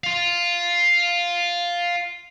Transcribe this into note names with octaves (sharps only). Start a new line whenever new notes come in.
F5 C6